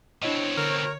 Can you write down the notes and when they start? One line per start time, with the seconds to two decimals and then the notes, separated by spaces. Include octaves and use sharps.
0.22 B2 C4 D4 E4 C#5 D#5
0.57 D3 A#4